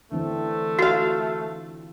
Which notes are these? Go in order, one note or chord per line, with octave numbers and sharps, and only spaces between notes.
D3 E3 A3 C4
F4 F#4 F5